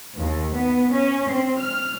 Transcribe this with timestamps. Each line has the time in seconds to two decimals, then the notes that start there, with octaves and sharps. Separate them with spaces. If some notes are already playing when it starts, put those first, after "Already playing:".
0.17 D#2
0.54 B3
0.92 C#4
1.29 C4
1.60 F6